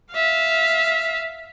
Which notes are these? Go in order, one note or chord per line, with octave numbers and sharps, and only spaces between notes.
E5 F5